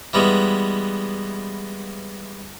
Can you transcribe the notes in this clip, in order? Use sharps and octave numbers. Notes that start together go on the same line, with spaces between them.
E3 G3 G#3 B3